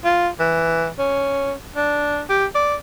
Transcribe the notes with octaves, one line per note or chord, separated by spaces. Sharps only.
F4
E3
C#4
D4
G4
D5